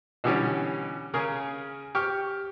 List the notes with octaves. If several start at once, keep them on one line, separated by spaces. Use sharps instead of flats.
B2 D3 E3 G3 C#4
C#3 C#4 G#4 A#4
G4 C#6 F6